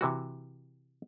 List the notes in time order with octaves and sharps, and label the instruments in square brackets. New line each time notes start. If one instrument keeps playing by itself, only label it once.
[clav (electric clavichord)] C3 E3 F#4